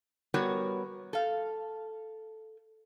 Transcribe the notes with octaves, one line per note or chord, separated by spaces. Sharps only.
G3 B3 F#4 A#4 C#5
A4 F5